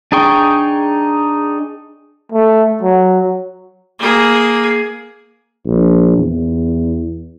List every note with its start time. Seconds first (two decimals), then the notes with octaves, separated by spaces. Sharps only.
0.12 D4 D#4 G#4 G5 C#6
2.32 A3
2.83 F#3
3.99 A#3 G#4
5.67 A#1
6.18 E2